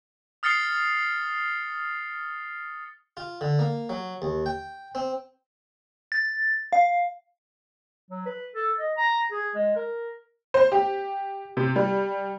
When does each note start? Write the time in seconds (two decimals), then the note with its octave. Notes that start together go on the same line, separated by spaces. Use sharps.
0.43 D#6 F6 A6 C7 C#7 G7
3.17 F4
3.41 D3
3.59 A#3
3.89 F#3
4.22 D#2
4.46 G5
4.95 C4
6.12 A6
6.73 F5
8.11 F#3
8.26 B4
8.55 A4
8.79 D#5
8.97 A#5
9.32 G#4
9.55 G#3
9.76 A#4
10.54 C5
10.72 G4
11.57 C3
11.76 G3